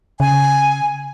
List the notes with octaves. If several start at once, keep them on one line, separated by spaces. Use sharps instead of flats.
C#3 G#5